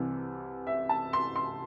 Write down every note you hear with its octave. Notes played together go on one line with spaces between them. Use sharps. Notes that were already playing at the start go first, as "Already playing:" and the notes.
Already playing: C2 C3 E3
E5
A5
C6
C6